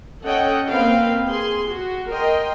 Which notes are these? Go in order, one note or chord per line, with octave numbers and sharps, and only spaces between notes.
C#4 A4 C#5 D#5 F#5 G5
A#3 C4 B4 F5 G5
G#4 C6
F#4
A#4 D#5 G5 C6